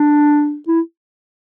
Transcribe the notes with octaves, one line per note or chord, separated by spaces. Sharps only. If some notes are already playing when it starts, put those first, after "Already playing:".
Already playing: D4
E4